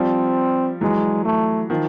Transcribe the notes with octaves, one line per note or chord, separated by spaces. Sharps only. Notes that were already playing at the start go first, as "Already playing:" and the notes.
Already playing: F3 G3 C4
E3 F#3 G#3
A3
D#3 F3